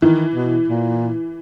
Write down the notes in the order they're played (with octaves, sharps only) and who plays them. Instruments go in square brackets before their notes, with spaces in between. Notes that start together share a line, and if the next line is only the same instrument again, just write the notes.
[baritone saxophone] D#3 [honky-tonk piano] E3
[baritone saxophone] B2
A#2